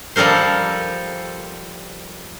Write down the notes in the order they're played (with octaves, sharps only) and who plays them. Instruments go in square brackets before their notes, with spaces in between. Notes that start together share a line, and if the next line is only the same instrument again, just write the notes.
[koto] F3 G3 A4 A#4 C5